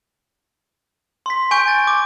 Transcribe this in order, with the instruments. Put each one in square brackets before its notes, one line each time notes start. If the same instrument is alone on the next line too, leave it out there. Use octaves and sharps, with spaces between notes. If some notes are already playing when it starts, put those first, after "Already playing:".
[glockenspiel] C6 B6
G#5 C#6 G6 D7
A6
D6